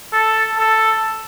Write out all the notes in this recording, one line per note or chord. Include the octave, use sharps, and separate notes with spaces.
A4
A4